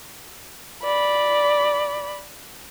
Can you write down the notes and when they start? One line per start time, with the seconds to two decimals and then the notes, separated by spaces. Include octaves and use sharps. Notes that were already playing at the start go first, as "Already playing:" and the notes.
0.84 D5 B5